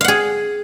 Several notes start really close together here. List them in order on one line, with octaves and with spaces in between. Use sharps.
F5 F#5 G#4